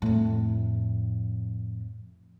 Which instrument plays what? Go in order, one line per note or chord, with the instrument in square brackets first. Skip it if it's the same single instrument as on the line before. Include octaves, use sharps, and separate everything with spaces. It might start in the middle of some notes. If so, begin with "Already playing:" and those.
[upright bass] F2 A2